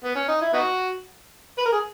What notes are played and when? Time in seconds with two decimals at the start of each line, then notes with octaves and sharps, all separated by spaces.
0.04 B3
0.16 C#4
0.28 D#4
0.41 E4
0.53 B3 D#4 F#4
1.58 B4
1.65 A#4
1.73 G#4